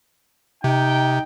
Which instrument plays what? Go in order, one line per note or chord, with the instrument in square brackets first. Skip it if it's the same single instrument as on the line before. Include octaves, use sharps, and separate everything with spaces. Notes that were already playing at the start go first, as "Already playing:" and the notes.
[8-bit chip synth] C3 [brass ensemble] D#4 G5